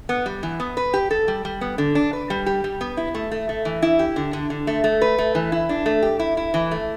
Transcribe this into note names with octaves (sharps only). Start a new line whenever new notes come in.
B3
G3
E3
B3
B4
G4
A4
G3
G3
B3
D3
D4
B4
G3
G4
G3
B3
E4
A3
A3
A3
E3
E4
G4
D3
D3
D3
A3
A3
B4
A3
E3
E4
D4
A3
G4
E4
E4
E3
A3